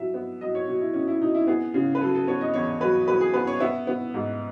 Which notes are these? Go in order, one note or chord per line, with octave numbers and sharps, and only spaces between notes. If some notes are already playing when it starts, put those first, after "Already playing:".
Already playing: F#3 E5
B3
F#3 D#5
C#5
B2
E4
B2 C#4
E4
B2 D#4
E4
B3 G#4
C#3
B4
F#3 A4
A4
B3 C#5
D#5
E2 C#5
F#3 B4
F#3 B4
G#4
B3 B4
C#5
B3 E5
B3
G#2